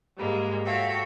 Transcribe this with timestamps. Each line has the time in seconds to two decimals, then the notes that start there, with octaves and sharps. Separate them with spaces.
0.16 G#2 G3 G#3 A#3
0.65 F#4 A4 C#5 E5 F5 G5